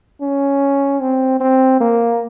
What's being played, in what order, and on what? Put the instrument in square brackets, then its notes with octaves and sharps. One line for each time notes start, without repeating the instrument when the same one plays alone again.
[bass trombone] C#4
C4
C4
A#3